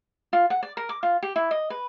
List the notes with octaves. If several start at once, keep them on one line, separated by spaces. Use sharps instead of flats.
F4
F#5
D5
A#4
D6
F4
G4
E4
D#5
B4